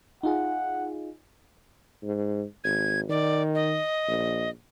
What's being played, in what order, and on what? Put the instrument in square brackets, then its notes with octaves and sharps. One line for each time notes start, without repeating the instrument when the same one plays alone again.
[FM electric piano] D#4 F4 G#4 [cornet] F#5
[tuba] G#2
[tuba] G#1 [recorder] G#6
[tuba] D#3 [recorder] D5
[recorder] D#5
[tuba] A#1